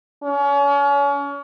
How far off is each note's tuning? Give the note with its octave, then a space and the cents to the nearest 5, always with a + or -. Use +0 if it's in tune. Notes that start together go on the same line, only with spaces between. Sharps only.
C#4 +35